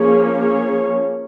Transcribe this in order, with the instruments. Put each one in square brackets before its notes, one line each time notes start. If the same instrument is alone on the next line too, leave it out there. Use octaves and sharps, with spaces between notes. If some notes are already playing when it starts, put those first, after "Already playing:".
Already playing: [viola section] F3 A#3 C#4 G#4 C#5
G#4 C#5